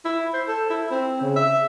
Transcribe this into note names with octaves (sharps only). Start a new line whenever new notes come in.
E4
C5
A4
E4
C4
C#3
E5